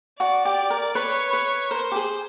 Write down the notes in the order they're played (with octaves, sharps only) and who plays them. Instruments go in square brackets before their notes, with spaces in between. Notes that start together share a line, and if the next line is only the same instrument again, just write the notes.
[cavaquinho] F#4 [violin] D5
[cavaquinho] G4
A#4
[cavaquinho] B4 [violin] C#5
[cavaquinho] B4
[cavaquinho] A#4 [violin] C5
[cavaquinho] G4
G#4